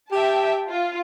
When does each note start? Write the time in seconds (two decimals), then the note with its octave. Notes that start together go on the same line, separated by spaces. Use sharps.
0.12 G4 E5 G5 A5
0.70 F4